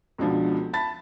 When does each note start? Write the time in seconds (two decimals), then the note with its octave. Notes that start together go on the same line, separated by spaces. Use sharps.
0.18 C#2 B2 D3 F3
0.73 A5 B5 A6